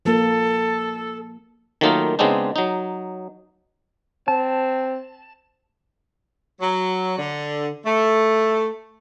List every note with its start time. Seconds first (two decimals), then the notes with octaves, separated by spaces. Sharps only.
0.05 F3 A#3 A4
1.81 D#3 F#3 A3 A#3 D#4 F4
2.19 C#3 G#3 B3 C4 D4 D#4
2.56 F#3 D#4
4.28 C4 A5
6.60 F#3
7.18 D3
7.86 A3